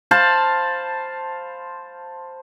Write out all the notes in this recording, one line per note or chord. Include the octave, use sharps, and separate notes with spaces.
C5 F5 A5 B5